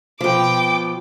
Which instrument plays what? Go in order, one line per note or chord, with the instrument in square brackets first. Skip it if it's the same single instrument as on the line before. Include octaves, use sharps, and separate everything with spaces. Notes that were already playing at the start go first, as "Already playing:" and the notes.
[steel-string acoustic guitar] B2 F3 [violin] G5 D6